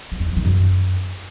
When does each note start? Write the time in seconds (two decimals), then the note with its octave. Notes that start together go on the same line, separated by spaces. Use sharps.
0.12 A3
0.20 E2
0.28 E3
0.36 D#3
0.45 F#2